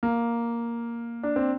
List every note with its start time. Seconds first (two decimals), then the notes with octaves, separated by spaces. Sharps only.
0.03 A#3
1.23 D4
1.36 C4